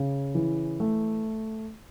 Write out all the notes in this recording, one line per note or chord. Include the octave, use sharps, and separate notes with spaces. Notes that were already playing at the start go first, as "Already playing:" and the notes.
Already playing: C#3
E3
A3